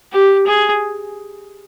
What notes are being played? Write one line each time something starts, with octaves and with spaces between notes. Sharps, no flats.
G4
G#4